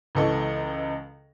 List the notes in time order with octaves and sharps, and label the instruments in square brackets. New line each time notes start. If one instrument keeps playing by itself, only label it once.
[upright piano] C#2 E3 A4 D#5 C#6